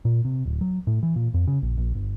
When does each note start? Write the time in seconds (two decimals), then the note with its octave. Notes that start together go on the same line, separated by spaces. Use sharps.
0.05 A#2
0.25 C3
0.46 D1
0.61 F#3
0.87 A2
1.03 E3
1.16 A#2
1.34 F2
1.47 C#3
1.62 A#1
1.77 A#1
1.95 G1